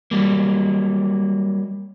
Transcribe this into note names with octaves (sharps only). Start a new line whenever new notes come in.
F#3 G3 A#3